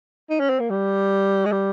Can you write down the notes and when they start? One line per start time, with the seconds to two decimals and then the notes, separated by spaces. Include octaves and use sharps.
0.30 D#4
0.40 C#4
0.50 C4
0.60 A#3
0.70 G3
1.45 G#3
1.52 G3